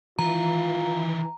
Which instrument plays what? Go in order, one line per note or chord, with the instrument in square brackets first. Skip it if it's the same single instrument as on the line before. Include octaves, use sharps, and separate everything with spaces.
[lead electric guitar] D#3 E4 [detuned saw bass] E3 [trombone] F4 [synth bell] A#5